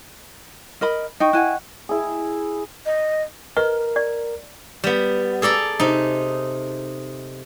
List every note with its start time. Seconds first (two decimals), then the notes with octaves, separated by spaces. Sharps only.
0.81 A#4 D#5 B5
1.20 D#4 D#5 G5 C#6
1.33 E4 F#5 G#5 F#6
1.89 E4 G#4
2.86 D#5
3.57 A#4 B4 D#5
3.96 D5
4.84 G3 B3
5.42 G#4 A4 D5 A#5
5.80 C3 D#4